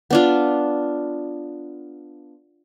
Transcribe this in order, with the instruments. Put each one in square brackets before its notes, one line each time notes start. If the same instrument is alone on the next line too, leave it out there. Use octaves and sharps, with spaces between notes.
[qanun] B3 D4 F4